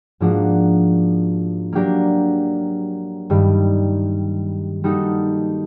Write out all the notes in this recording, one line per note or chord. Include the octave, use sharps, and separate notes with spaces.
G#2 F3 A#3 D4 F#4
F#3 A#3 D4 G4 A#4
G2 D#3 G3
G3 A#3 D#4 F#4 A4